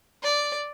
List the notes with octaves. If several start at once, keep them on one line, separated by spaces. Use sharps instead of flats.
D5